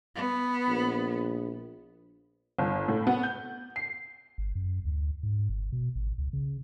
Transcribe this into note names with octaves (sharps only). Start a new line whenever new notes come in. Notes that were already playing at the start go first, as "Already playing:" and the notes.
B3
A#1
G1
A2
B3
G6
C7
G1
F#2
D2
G#2
G1
B2
G#1
C#2
C#3